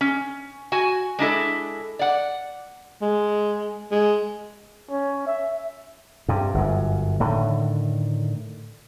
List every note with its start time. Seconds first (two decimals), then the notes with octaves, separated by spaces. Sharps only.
0.01 C#4
0.72 F#4 G#5
1.19 G#3 D4 E4 A4
1.99 D5 F#5
3.02 G#3
3.92 G#3
4.91 C#4
5.27 E5
6.28 G2 C3
6.54 G1 F#2
7.20 A2 D3 D#3